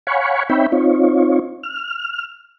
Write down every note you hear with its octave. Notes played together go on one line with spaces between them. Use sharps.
C#5 F5 F#5 G#5 B5 C#6
C4 D#4 C#5 E5 G5 B5
C4 D#4 F4 C#5
F6